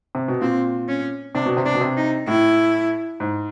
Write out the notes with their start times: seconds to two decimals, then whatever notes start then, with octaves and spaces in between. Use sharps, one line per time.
0.15 C3
0.28 B2
0.41 A#2 C4
0.88 C#4
1.35 C3 D4
1.46 B2
1.57 C3
1.65 D4
1.75 B2
1.81 C3
1.97 D#4
2.27 A2 E4
3.20 G#2